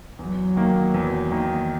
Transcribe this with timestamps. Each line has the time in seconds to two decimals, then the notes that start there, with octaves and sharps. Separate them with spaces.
0.19 E2 F#3
0.56 D#3 A#3
0.94 E2
1.31 D#3 A#3